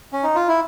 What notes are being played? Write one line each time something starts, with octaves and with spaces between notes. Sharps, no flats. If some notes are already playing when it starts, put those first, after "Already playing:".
C#4
D#4
F4
E4